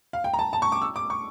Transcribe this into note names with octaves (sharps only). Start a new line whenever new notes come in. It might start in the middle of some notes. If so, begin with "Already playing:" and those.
F5
G5
A#5
A5
A5
C#6
D6
E6
D6
C#6